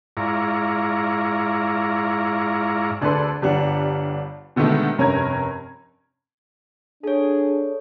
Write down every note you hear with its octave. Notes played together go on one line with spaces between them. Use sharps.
G#2 E4 F4 D5 A#5 C#6
D2 D4 G#4 A4 B4 C6
G1 G3 D4 F#5
B2 D3 D#3 G#3 A3 B3
F1 G2 C#4 A#4 A#5 G#6
D4 G#4 A4 C#5